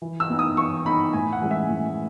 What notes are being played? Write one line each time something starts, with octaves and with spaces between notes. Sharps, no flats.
E3
E6
B3 D#4
D#6
E3 C#6
B3 D#4 B5
A2 G#5
F#5
E3 G#3 C#4
E5
A2